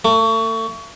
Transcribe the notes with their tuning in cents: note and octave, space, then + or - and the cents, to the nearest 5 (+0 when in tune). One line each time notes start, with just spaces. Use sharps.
A3 +35